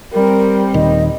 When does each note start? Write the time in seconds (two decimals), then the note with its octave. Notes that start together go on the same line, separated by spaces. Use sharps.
0.13 G3 C4 A#4
0.74 D#1 D#3 D#5